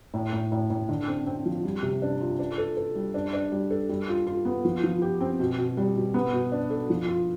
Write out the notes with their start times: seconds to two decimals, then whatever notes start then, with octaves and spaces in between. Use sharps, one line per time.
0.14 A2
0.33 A2
0.52 A2
0.70 A2
0.89 D3
1.08 C4
1.26 C4
1.45 F3
1.64 G3
1.83 C3
2.02 D4
2.20 F4
2.39 D4
2.58 A4
2.77 A4
2.95 G3
3.14 D4
3.33 D4
3.52 G3
3.71 A4
3.89 G3
4.08 F4
4.27 F4
4.45 B3
4.65 F3
4.83 F3
5.02 G4
5.21 C4
5.40 B2
5.58 B2
5.77 G3
5.96 B2
6.14 B3
6.33 B2
6.52 D4
6.70 A4
6.90 F3
7.08 F4